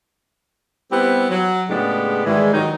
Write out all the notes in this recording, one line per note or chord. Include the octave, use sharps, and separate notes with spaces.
G3 B3 C4 E4 G4
F#3
A2 C#3 G#3 B3 D4 G4
G#2 D#3 E3 G3 G#3
D#3 F#3 D#4